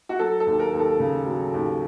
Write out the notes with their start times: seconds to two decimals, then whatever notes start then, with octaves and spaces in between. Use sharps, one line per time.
0.09 F#4
0.19 F#3 A4
0.40 A4
0.46 D#2
0.59 A#4
0.73 D#2
0.79 A4
0.99 C#3
1.27 F#3
1.53 D#2